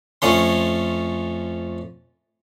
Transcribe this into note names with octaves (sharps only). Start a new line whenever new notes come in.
F2 A3 C#4 C6